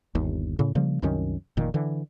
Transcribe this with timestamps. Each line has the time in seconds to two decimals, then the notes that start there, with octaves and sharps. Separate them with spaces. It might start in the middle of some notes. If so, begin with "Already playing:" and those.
0.15 G1 D#2
0.59 A2 C#3
0.75 C#3 F3 G3 A#3
1.02 C2 F#2 D#3 C#4
1.57 F1 A#2 D#3
1.74 D3 E3